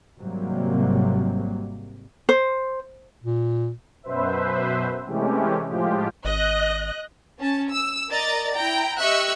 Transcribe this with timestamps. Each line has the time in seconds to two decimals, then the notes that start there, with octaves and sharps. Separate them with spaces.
0.19 G#1 G#2 C3 F#3 G3 A#3
2.29 C5
3.24 A#2
4.03 F#2 B2 B4 C5 E5
5.06 C3 E3 G#3 A3 C#4 G4
5.67 A2 F3 G#3 F4 G4
6.25 G#1 D#5 F#6
7.39 C#4 A5
7.70 E6
8.09 A#4 D5 D#5 A#5 A6
8.55 E4 G5 A#5
9.00 G4 D#5 E5 C#6 E6 F#6